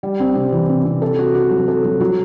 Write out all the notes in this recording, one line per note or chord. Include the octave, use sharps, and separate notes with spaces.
G3
C4
C3
E3
C3
C3
A4
F#4
F#4
F#3
A4
F#3
F#3